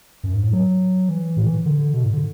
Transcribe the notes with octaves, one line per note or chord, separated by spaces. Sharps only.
F#2
G#2
A2
F#3
E3
A2
E3
D3
B2
G#2
D3